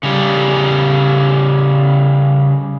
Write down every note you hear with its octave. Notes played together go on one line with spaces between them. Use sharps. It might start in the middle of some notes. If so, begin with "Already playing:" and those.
C#3 G3